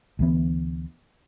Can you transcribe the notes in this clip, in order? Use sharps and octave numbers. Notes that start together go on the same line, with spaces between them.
D2 E3 B3